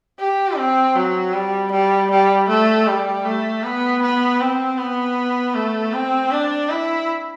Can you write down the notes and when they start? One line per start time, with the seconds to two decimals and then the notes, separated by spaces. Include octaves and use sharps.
0.19 G4
0.58 C4
0.96 F#3
1.33 G3
1.72 G3
2.11 G3
2.49 A3
2.87 G3
3.25 A3
3.64 B3
4.02 B3
4.41 C4
4.78 B3
5.54 A3
5.93 C4
6.31 D4
6.70 E4